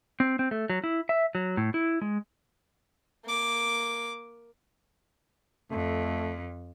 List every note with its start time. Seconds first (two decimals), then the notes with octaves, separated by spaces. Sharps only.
0.20 C4
0.39 C4
0.51 A3
0.70 F#3
0.84 E4
1.09 E5
1.35 F#3
1.57 A2
1.74 E4
2.02 G#3
3.25 A#3 D6
5.71 F2 A3